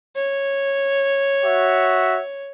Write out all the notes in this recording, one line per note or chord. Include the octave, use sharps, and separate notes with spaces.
C#5
F#4 E5